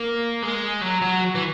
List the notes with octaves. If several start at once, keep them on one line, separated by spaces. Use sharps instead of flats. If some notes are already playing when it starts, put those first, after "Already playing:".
Already playing: A#3
G#3
F#3
F#3
E3